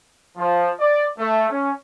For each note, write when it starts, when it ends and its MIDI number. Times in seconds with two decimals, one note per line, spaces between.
0.38 0.71 53
0.80 1.05 74
1.19 1.49 57
1.50 1.72 61